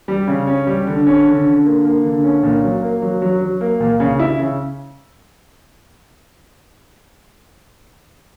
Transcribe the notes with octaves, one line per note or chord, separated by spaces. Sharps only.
G3
C#3
C#4
G3
D3
C#4
D3
D3
A#3
A#3
D3
C#4
A#2
F#3
A#3
F#3
F#3
F#3
A#3
A#2
C#3
E4
C#3